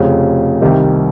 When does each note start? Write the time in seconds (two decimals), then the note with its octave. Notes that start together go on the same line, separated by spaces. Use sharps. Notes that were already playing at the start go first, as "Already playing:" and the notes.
Already playing: F1 F2 C#3
0.61 C2 C3 D#3 G3